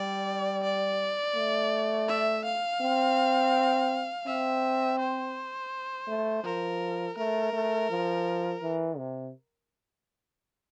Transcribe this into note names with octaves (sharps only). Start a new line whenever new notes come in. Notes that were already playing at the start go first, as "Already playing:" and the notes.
Already playing: G3 D5
D5
A3
E5
F5
C4
C4 E5
C5
A3
F3 A#4
A3 A#4
A3
F3
E3
C3